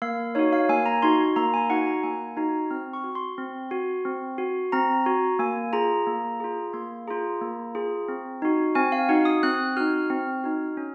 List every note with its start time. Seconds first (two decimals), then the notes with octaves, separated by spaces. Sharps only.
0.02 A#3 F5
0.35 D#4 F#4 C#5
0.53 F5
0.69 A#3 G#5
0.86 A#5
1.02 D#4 F#4 C6
1.36 A#3 A#5
1.54 G#5
1.70 D#4 F#4 F#5
1.87 A#5
2.03 A#3 G#5
2.37 D#4 F#4 A#5
2.71 C4 F6
2.93 C#6
3.04 F#4
3.15 C6
3.38 C4
3.71 F#4
4.05 C4
4.38 F#4
4.72 C4 A#5
5.06 F#4
5.39 A#3 G#5
5.73 F4 G#4 A#5
6.07 A#3
6.40 F4 G#4
6.73 A#3 C6
7.08 F4 G#4 A#5
7.41 A#3
7.75 F4 G#4
8.08 C4
8.42 D#4 F#4
8.75 C4 G#5
8.92 F5
9.09 D#4 F#4 F#5
9.25 D#6
9.43 C4 F#6
9.77 D#4 F#4 F6
10.10 C4
10.44 D#4 F#4
10.77 C#4